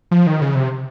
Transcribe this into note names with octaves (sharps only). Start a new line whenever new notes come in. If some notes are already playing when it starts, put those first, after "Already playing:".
F3
D#3
C#3
C3